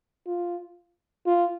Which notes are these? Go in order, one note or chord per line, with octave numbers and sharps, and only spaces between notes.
F4
F4